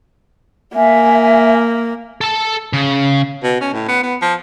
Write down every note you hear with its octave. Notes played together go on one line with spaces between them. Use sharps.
A#3 E5 G#5
A4 A5
C#3
B2
C#4
A2
B3
B3
F3